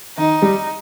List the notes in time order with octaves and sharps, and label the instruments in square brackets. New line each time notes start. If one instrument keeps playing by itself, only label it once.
[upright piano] D#3 [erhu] D#4
[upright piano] G3